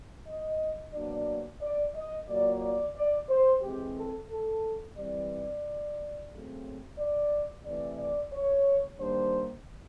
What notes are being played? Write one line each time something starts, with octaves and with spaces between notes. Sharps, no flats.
D#5
B2 F#3 A#3 D4 D5
D5
D#5
A#2 F#3 A#3 D5
D5
D5
C5
E3 G#3 C4 G4
A4
A4
E3 G3 C4 D5
C#3 F#3 A3 C4
D5
C3 E3 A3 D5
D5
C#5
D#3 G3 A#3 D4 C5